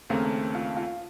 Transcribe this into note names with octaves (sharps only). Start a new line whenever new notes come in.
D#2 C#3 A3 A#3 C4
F4
F4